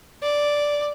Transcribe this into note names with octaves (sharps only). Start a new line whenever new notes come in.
D5